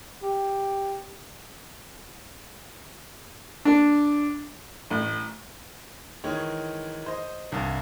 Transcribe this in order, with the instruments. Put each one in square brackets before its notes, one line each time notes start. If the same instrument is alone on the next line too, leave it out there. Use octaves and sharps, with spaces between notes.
[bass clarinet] G4
[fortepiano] D4
A1
[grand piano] D#3 E3 G#3 C#5
C5 D#5
C2 G2